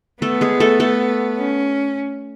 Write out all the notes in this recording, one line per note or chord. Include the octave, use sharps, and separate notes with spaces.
A3 B3 A4
G#3 G#4
A3 A4
A3 A4
C#4